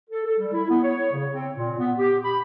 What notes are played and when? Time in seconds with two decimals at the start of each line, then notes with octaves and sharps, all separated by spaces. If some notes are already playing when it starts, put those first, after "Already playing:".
0.10 A4
0.26 A4
0.39 G3
0.53 E4
0.70 B3
0.84 C#5
1.12 C#3
1.33 C4
1.55 A#2
1.78 B3
1.98 G4
2.24 B5